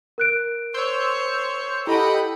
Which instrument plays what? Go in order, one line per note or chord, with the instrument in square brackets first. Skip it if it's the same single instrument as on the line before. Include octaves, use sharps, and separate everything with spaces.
[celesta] A#4 F#6 D7
[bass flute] C5 [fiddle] C#5 [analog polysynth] C6 E6 G6
[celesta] E4 [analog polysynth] G4 D#5 G5 [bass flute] A4 [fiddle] F#5 B5